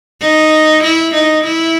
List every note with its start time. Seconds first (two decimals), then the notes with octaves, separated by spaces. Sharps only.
0.21 D#4
0.84 E4
1.14 D#4
1.44 E4